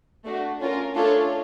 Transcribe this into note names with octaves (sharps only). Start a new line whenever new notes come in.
A3 D4 F#4
C#4 F4 A#4
A3 D4 F4 A4 C#5